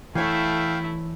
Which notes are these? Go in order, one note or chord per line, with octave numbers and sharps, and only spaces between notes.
E3 A3 E4 C#5 F5 G5